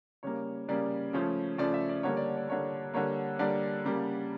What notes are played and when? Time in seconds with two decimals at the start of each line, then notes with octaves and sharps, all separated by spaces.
0.23 C#3 G3 A#3 C#5
0.69 C#3 G3 A#3 D5
1.13 C#3 F3 A3 C#5
1.58 C#3 F3 A3 D5
1.74 E5
1.89 D5
2.03 D3 G3 A#3 C#5
2.17 D5
2.37 D5
2.49 D3 G3 A#3 C#5
2.94 D3 G3 A#3 C#5
3.39 D3 G3 A#3 D5
3.85 C#3 G3 A#3